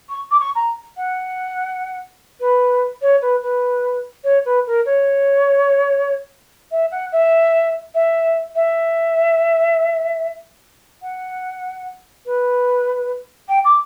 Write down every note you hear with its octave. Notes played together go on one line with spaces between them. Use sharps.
C#6
D6
C#6
A#5
F#5
B4
C#5
B4
B4
C#5
B4
A#4
C#5
E5
F#5
E5
E5
E5
F#5
B4
G5
D6